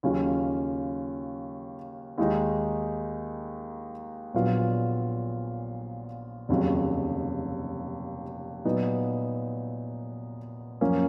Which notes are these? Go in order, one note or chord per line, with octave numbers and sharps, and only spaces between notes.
D#2 C#3 F#3 C#4 F4
D#2 D#3 G#3 D#4
A#1 A#2 F#3 B3 F4
F1 D#2 C#3 F#3
A#2 F#3 B3 D#4
F#2 F3 A#3 C#4